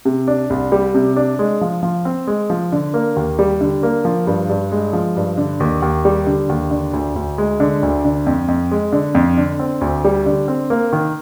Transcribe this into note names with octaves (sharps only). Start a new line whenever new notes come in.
C3
D4
C2
G3
C3
D4
G#3
F3
F3
C4
G#3
F3
D3
A#3
D#2
G3
D3
A#3
F3
G2
G2
G#3
F3
G2
D3
D#2
D#2
G3
D3
D#2
D3
D2
D2
G#3
D3
D2
D3
F2
F2
G#3
D3
F2
D3
C4
D2
G3
D3
C4
A#3
D#3